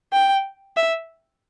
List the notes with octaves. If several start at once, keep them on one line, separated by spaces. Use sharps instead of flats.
G5
E5